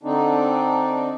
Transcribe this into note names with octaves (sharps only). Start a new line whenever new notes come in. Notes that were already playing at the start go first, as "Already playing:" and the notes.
D3 C4 D4 D#4